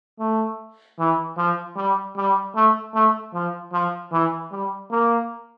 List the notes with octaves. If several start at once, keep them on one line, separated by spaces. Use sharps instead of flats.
A3
E3
F3
G3
G3
A3
A3
F3
F3
E3
G3
A#3